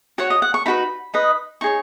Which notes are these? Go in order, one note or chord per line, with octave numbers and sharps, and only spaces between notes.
F#4 C#5 F#5
D#5
F#5
C#6
D#4 F#4 B4 B5
D#4 B4 D#5
D#4 G#4 C#5 C#6